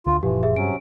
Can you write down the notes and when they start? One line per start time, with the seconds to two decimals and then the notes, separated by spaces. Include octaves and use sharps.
0.06 D2 D3 F4
0.23 F#1 A#2 E3 F3 G4
0.43 G#4 E5
0.56 G2 C3 F#3 C#4 D7